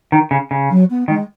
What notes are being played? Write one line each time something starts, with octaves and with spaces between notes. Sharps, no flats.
D#3
C#3
C#3
F#3
B3
D#3 G#3